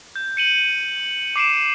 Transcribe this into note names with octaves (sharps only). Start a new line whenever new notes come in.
G6
C#7 D#7 F#7
D6 C7 D7 E7